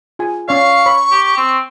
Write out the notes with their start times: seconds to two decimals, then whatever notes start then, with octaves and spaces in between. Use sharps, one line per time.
0.19 F4 G#4 G#5
0.48 C#4 D5 F5 C#6
0.86 C#5 B5
1.11 G4
1.37 C4